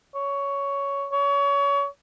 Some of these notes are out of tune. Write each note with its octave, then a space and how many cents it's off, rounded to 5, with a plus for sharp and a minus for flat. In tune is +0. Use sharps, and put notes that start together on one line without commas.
C#5 +10
C#5 +30